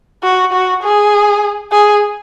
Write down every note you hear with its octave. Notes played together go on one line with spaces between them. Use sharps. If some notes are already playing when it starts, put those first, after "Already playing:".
F#4
F#4
G#4
G#4